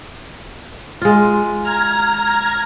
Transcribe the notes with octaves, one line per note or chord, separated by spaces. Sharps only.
G#3 F4
A#5 F6 G#6